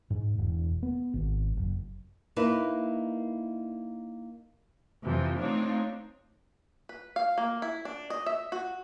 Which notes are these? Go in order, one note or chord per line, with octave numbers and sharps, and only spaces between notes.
G#2
E1
B3
G#1
F#1
A#3 D#4 E4 B4
F2 C3 E3 F3
A3 C4 D4 D#4 F4 C#5
B4
F5
A#3
E4
D4
D#5
E5
F#4